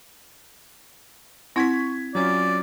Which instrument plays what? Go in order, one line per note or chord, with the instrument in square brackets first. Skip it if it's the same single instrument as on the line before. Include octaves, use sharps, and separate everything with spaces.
[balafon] C4 E4 F#5 [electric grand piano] C#6 G#6 B6
[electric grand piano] F#3 C#4 F4 [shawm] D5